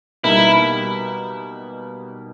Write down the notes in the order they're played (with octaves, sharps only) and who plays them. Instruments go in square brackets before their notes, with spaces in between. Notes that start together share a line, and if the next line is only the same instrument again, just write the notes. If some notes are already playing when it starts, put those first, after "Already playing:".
[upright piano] B2 G3 A#3 D#4 [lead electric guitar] E4